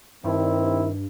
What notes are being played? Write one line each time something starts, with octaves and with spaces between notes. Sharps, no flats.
G2 D#3 C4 E4